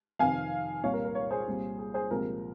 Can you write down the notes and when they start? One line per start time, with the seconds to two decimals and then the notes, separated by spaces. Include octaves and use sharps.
0.19 F2 C3 D#3 F5 G#5
0.83 C2 A#2 G3 C#5 F5
0.94 A#4
1.05 A#4
1.15 A#4 C#5
1.31 G#4 C5
1.47 C2 A#2 G3
1.79 G#4
1.94 G#4 C5
2.11 C2 A#2 F3 G#3 A#4